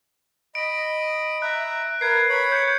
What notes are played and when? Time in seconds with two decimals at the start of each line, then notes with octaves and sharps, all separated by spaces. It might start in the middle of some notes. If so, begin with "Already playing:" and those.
0.55 D#5 B5 D7
1.42 E5 A#5 F#6
2.01 A#4 B4 G#6 C7
2.29 C#5 B5
2.52 G6 C#7